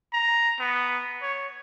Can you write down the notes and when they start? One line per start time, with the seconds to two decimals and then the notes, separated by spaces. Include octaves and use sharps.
0.13 A#5
0.60 B3
1.22 C#5